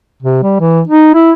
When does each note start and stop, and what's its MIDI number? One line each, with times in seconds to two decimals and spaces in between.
0.22 0.41 48
0.43 0.58 55
0.60 0.81 52
0.87 1.10 63
1.14 1.32 64